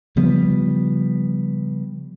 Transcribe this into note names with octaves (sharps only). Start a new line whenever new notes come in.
C#3 F3 G3 B3